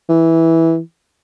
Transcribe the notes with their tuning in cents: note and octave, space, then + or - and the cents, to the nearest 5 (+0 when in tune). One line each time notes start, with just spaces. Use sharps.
E3 -10